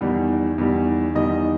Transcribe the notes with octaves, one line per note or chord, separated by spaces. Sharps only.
E2 D#3 G3
E2 D#3 G3
E2 D#3 G3 D#5